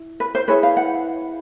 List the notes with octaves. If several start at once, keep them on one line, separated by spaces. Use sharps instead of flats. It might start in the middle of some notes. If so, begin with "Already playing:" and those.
Already playing: E4
B4
C5
E4 G#4 B4 C#5
F5
F#5